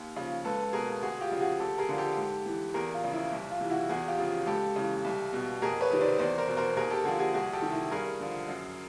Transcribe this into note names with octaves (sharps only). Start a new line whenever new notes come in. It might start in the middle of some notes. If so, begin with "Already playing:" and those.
Already playing: D#2
C#3 F3
C#2 A4 B4
B2 G#4 A#4
D2 F#4 G#4
F4 G4
C#3 F3
F#4 G#4
D2 G4 A4
G#4 A#4
D3 F3
G4 A4
G#2
E3
E2 G#4 A#4
F4
C#3 F3
E4
C2
F4
C3 E3
E4 F#4
E2 F#4 G#4
F4 G4
C#3 F3
C#2 G4 A4
C#3 E3
C2
B2
F2 G#4 A#4
B4 C#5
C3 D#3
C5 D5
E2 C5 D5
A#4 C5
B2
A#4 C5
D#2 G#4 A#4
G4 A4
D3 F3 F#4 G#4
F#4 G#4
C2 F#4 G#4
G4 A4
C3 D#3
E4
G2 G#4 A#4
D3 F3
F#2